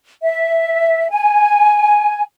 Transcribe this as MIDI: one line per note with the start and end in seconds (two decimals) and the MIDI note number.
0.22 1.08 76
1.10 2.21 80